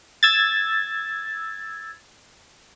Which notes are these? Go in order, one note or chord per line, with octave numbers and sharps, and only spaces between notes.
E6 G#6 A6